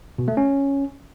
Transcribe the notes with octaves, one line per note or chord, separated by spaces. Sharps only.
B2
A3
C#4